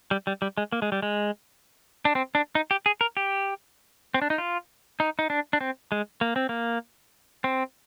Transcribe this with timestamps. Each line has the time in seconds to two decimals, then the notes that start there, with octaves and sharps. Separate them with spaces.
0.11 G3
0.27 G3
0.42 G3
0.58 G#3
0.72 A#3
0.82 G#3
0.92 G3
1.02 G#3
2.05 D4
2.15 C4
2.35 D4
2.55 D#4
2.71 G4
2.86 G#4
3.01 A#4
3.17 G4
4.14 C4
4.22 D4
4.30 D#4
4.38 F4
5.00 D#4
5.19 D#4
5.30 D4
5.53 D4
5.61 C4
5.92 G#3
6.21 A#3
6.36 C4
6.49 A#3
7.44 C4